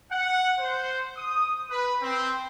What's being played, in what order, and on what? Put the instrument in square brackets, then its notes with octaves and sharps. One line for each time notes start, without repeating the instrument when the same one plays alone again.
[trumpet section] F#5
C5
D#6
B4
C4